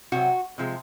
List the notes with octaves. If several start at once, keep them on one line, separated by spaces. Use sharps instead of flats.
C3 F#3 F#4
C3 F3 G#3